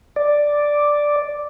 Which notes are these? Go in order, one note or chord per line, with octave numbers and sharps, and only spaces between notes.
D5